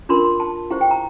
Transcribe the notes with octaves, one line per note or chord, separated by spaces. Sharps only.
D4 F4 A#4 C6
C6
A5
E4 G4 C5 F5
G5
A#5